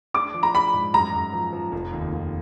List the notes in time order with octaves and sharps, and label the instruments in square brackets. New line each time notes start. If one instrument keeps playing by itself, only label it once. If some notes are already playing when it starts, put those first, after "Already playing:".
[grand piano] D4 [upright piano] D6
[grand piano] F3
[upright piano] A#5
[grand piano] D4 [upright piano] B5
[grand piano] G#2
[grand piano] F#2 [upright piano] A#5
[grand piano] F#2
F3
F3
F1
D#2
F1